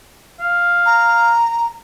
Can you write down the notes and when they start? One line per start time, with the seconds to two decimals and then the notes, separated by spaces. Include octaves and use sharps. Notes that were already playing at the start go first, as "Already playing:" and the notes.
0.40 F5
0.86 A#5